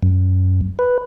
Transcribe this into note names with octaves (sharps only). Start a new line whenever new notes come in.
F#2
B4